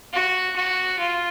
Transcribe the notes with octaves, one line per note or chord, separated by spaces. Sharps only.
F#4
F#4
F4